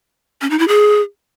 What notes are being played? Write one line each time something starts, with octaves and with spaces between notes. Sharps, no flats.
C#4
D#4
E4
G#4